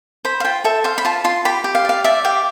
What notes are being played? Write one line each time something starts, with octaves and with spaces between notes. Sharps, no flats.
C5 B5
F5
F4 G5
A4 E5
C5 F5
B5
F4 A5
F4 C6
G4 B5
G4
F5
D5 F5
D5 E5
G4 F5